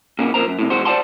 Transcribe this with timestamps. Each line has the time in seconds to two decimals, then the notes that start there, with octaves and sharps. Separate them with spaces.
0.19 A#2 C#3 A#3 B3
0.34 F2 A#2 A#4 C5 A#5
0.47 F#2
0.59 A2 C3
0.70 E2 G#3 F#4 C5
0.85 C5 D5 D#5 F#5 A5 C6